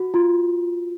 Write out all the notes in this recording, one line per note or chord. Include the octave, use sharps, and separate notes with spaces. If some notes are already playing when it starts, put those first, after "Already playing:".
Already playing: F#4
F4